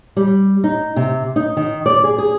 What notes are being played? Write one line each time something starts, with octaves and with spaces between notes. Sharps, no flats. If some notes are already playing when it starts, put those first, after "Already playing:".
G3
D#4
C3
D#4
D#3
D5
G#4
G#4